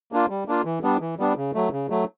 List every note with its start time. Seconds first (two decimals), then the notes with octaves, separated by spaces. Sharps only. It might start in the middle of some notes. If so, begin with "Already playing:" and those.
0.12 A#3 D4 F4
0.29 G3
0.48 A#3 D4 F4
0.65 E3
0.83 G3 B3 D4
1.01 E3
1.19 G3 B3 D4
1.37 C#3
1.55 F#3 A3
1.72 C#3
1.90 F#3 A3